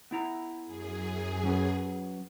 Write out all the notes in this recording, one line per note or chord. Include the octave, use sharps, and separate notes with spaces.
B3 E4 A#5
F#2 G#4
F#3 C#4 B4